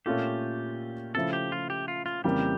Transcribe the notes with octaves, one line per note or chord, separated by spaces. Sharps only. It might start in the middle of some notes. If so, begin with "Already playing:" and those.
A#2 A3 C#4 F4 G4 A4
C#3 F3 A3 E4 A4
G4
F4
G4
F4
F4
F2 C#3 E3 G3 A#3 G4